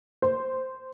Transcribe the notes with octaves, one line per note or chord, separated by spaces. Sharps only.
C5